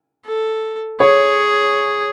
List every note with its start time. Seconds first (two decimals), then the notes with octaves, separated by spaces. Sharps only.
0.26 A4
1.00 G#4 C#5